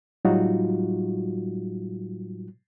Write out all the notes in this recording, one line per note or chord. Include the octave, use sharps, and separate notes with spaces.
A2 F#3 G3 D#4 F4 F#4